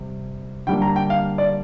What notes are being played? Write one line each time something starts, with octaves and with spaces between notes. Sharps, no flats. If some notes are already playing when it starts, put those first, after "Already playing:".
Already playing: C3 G3
D3 G3 A#3 G5
A#5
G5
F5
D5